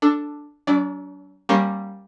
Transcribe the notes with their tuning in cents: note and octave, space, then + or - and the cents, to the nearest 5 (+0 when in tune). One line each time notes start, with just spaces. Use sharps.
D4 +0 A4 +10
F#3 +30 D4 -40 D5 +0
G3 +0 A#3 +0 C#4 -20